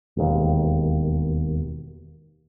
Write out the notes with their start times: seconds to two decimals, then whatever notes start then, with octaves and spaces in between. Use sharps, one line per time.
0.17 E1 D#2